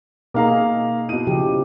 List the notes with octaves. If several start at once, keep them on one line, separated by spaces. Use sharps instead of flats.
B2 A#3 D#4 G#4 F5 A#5
B2 E4 D#7
C#3 F3 G4